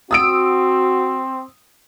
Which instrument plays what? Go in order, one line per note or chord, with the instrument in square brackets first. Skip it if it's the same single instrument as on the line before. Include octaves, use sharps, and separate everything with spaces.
[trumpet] C4 [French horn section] F#4 [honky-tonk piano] D#6 E6 D7